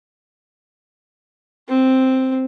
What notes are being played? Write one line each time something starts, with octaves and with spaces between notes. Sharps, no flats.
C4